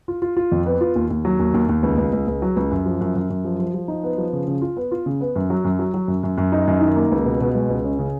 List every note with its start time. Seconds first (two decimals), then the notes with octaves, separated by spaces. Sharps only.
0.08 F4
0.22 F4
0.37 F4
0.52 F2
0.66 B3
0.81 F4
0.96 D#2
1.10 D#2
1.25 F#3
1.39 D#2
1.54 D#2
1.69 D#2
1.83 C#2
1.98 C#2
2.13 C#2
2.27 C#2
2.42 F#3
2.56 C#2
2.71 F#2
2.86 F3
3.01 F#2
3.16 F#2
3.30 F#2
3.45 F3
3.59 F3
3.74 F3
3.88 D#4
4.03 B3
4.18 F3
4.33 C#3
4.48 C#3
4.62 F4
4.77 B3
4.91 F4
5.06 C#3
5.21 B3
5.36 F#2
5.50 F#3
5.64 F#2
5.79 F#3
5.94 F#3
6.08 F#2
6.23 F#2
6.38 F#2
6.52 D#4
6.68 F#2
6.81 D#3
6.96 A#3
7.12 C#2
7.25 B2
7.40 B2
7.55 G#3
7.69 C#2
7.84 C#4
7.99 C#3